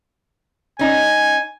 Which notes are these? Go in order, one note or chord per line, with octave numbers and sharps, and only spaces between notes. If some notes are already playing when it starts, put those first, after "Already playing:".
C#4 D#4 G#5